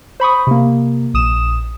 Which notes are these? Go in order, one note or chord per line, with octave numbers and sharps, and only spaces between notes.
C5 B5 C#6 D#6
C3 A#3
A#1 D#6 E7